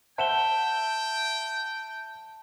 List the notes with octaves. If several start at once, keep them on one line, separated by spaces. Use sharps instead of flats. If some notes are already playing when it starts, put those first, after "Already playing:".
C5 E5 F#5 G5 A5 E7 G7